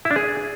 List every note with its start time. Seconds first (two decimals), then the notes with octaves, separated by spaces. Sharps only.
0.05 E4
0.11 D4
0.16 G#4